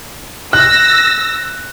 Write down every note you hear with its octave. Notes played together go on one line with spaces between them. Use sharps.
E6 F#6 A#6